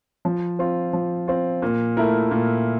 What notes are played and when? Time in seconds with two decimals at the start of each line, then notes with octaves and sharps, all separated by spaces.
0.25 F3
0.59 C4 F4
0.93 F3
1.28 C4 F4
1.62 A#2
1.97 A3 E4 A#4
2.31 A#2